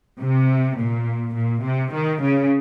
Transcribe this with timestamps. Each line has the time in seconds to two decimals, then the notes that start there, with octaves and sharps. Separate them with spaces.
0.21 C3
0.79 A#2
1.36 A#2
1.64 C3
1.92 D#3
2.21 C#3